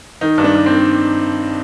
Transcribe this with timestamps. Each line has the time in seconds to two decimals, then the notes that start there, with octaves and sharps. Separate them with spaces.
0.21 D#3 D#4
0.38 G2
0.44 D4
0.55 G2
0.66 C4
0.72 D#3